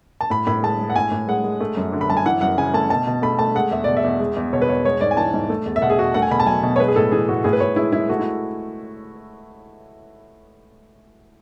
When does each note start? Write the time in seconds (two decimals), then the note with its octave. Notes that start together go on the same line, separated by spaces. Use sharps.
0.21 A5
0.30 A2 B5
0.47 A2 B5
0.63 G#3 A5
0.79 G#3
0.90 F#5
0.95 A2 G#5
1.11 A2
1.28 G#3 F#5
1.44 G#3
1.61 A3
1.77 F#2
1.92 D3
2.01 B5
2.09 F#2 A5
2.17 G#5
2.26 E3 F#5
2.41 F#2 F#5
2.57 C#3 G#5
2.74 A3 A5
2.90 B2 A5
3.07 B2
3.22 A3 B5
3.39 A3 A5
3.55 G#3 F#5
3.71 E2 E5
3.84 B2 D5
3.97 E5
4.04 E2
4.20 G#3
4.37 E2
4.53 B2 C#5
4.62 B4
4.68 E2 C#5
4.85 G#3 C#5
5.01 G#2 D5
5.11 G#5
5.17 E3 A5
5.34 G#2
5.49 A3
5.66 E2
5.76 E5
5.82 B2 F#5
5.90 G#4
5.99 E2 F#4
6.14 A3 F#5
6.22 G#5
6.31 B2 B5
6.40 A5
6.47 F#3 G#5
6.63 B2
6.76 C#5
6.80 G#3 B4
6.88 G#4
6.96 A2 A4
7.12 E3 G#4
7.29 A2 F#4
7.44 A2 G#4
7.53 B4
7.60 A2 C#5
7.76 G#3 E4
7.92 G#3 E4
8.10 A3 F#4
8.19 E4